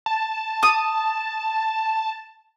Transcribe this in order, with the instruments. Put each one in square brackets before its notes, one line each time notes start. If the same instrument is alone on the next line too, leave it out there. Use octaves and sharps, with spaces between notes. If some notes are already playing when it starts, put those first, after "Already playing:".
[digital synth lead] A5
[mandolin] D#6